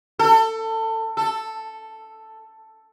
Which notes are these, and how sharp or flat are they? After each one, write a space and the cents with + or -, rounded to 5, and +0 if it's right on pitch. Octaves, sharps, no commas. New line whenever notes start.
A4 +25
A4 +5